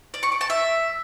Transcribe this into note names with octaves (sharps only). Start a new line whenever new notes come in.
D5
C#6
D6
A5
E5